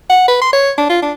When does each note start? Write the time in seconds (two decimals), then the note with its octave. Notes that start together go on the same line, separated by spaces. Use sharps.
0.10 F#5
0.28 B4
0.41 C6
0.53 C#5
0.78 D4
0.89 F4
1.02 D4